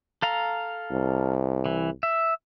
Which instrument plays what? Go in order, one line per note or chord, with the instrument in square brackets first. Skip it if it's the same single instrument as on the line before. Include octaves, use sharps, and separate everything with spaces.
[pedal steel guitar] A4 F5 A#5
[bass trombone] C2
[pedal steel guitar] E3
E5